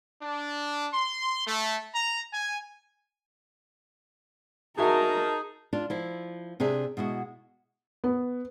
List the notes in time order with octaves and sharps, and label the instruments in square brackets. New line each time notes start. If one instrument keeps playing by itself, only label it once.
[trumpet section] D4
C6
A3
A#5
G#5
[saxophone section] D#4 G#4 [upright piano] F#4 E5 [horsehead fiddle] A#4 A5
[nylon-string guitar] D4 F4
F3 E4
C3 D4 G#4 E5
B2 G#3 E4 F#4
[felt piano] B3